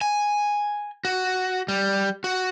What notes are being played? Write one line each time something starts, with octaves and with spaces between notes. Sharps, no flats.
G#5
F#4
G3
F#4